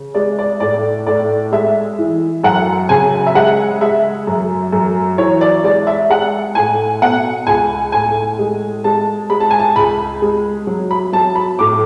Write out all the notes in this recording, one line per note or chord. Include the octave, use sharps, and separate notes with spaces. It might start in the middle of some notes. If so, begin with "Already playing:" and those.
Already playing: C#3
G#3 D5
D5
A2 D5
A2 D5
G#3 E5
E3
F#2 F#5
C#3 G#5
E5
G#3 F#5
G#3 E5
F#2
F#2
E3 C#5
D5
G#3 D5
E5
G#3 F#5
A2 G#5
B2 F#5
C#2 G#5
A2 G#5
G#3
G#3 A5
G#3 B5
A5
G#5
A5
C#2 B5
G#3
F#3
B5
F#3 A5
B5
A2 D6